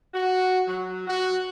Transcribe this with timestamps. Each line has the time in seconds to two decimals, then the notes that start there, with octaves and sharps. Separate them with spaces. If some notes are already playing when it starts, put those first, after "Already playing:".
0.14 F#4
0.68 F#3
1.08 F#4